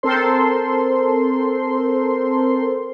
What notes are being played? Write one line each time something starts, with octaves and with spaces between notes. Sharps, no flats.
C4 A4 A#4 C5 C6